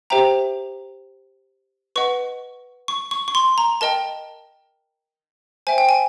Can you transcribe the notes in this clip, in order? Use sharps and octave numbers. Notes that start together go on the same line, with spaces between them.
G4 C5 E5 G5 A#5
B4 D#5 F#5 C#6
C#6
C#6
C#6
C6
A#5
A#4 D#5 G5 A5
C5 E5 G5 G#5
G5
G#5